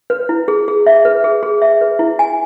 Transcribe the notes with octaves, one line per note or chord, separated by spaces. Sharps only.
B4
E4
G#4
G#4
E5
B4
G#4
G#4
E5
B4
E4
G#5